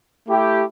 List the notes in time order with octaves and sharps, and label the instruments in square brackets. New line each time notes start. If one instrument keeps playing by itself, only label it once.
[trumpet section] A3 E4 G4